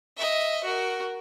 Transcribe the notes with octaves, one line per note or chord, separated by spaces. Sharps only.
D#5 E5
F#4 A#4